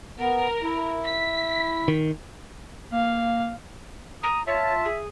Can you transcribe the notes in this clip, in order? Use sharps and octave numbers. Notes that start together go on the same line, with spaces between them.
B3 A#4
E4
B6
D#3
A#3 F5
A#5 D#6
F4 C#5 E5 A5
G#4